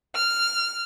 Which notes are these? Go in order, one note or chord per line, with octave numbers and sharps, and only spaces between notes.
F6